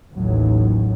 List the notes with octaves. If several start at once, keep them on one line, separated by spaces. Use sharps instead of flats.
A1 D#2 A2 F#3